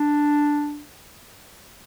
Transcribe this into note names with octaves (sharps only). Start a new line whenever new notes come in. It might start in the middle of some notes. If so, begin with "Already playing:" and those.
Already playing: D4